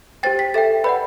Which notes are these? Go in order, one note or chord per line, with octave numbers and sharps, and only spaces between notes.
G4 C5 G5 A6
B6
A4 E5 G5 A6
B4 D5 F#5 B5